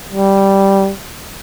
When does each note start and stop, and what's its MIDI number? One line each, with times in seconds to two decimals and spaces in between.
0.13 0.91 55